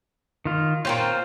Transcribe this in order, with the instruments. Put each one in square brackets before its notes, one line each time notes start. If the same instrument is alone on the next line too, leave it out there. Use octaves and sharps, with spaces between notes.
[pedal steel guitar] D#3 F4
[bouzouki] A#2 C4 C#4 [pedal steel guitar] F4 C5